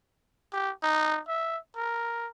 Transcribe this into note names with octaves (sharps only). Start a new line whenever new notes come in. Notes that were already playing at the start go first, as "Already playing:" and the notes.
G4
D#4
E5
A#4